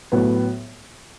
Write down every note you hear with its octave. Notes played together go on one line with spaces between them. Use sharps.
A2 F#3 B3